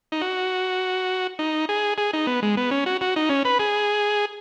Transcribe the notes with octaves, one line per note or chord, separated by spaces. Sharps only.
D#4
F#4
D#4
G#4
G#4
D#4
B3
G#3
B3
C#4
F#4
F#4
D#4
C#4
B4
G#4